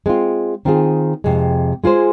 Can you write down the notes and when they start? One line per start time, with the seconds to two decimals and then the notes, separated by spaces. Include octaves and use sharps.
0.06 G#3 C4 F4
0.65 D#3 C4 F4 G#4
1.24 F2 C3 G#3
1.84 G#3 F4 G#4 C5